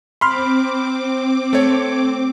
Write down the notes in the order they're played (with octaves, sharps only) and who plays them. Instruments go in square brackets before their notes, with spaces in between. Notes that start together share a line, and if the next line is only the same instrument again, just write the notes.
[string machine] C4 D6 [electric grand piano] B5 C6 F6
[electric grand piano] A3 C#5